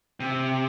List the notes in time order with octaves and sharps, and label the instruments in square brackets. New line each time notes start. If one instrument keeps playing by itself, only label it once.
[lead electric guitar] C3